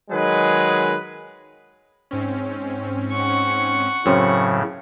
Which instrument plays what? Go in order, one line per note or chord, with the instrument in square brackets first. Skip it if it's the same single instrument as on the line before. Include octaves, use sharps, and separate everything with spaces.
[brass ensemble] D#3 F#3 G#3 G#4 B4
[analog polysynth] G#2 C4 C#4
[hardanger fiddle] F#5 C#6
[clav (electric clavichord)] F#2 C4 C#4 [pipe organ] A2 C#3